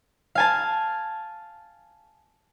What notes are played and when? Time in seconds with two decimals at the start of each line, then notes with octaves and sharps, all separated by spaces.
0.35 F5 G#5 A5